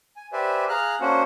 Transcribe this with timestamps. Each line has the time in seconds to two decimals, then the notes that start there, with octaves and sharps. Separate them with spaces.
0.16 G#5
0.33 G4 B4 C5 D5 E5 G#5
0.69 G#4 F5 A#5 F6 F#6
1.01 A#3 C#4 D4 F#4 C5 F#5